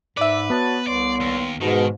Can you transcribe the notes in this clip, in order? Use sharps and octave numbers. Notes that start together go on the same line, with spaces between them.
G#2 B4 D5 E5
B3 F#4 C#5 A5
C2 C#5 D5 C6
D#2
G#2 B2 D#3 G#3